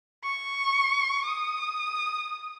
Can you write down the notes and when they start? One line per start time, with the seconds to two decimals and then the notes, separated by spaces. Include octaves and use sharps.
0.24 C#6
1.26 D#6